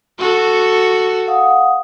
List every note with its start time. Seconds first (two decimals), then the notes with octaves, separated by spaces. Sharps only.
0.19 F#4 A4
1.28 F5 F#5 D#6